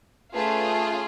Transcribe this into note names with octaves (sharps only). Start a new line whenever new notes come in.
A3 C#4 F4 G#4 B4